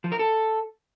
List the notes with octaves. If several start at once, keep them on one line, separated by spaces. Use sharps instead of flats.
F3
A#4
A4